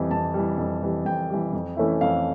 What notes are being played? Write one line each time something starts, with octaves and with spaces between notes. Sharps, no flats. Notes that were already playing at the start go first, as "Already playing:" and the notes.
Already playing: F2 E3 G3
F2 A5
E3 G3
F2
E3 G3
F2 G5
E3 G3
F2
E3 A3 C#4 E4
F2 F5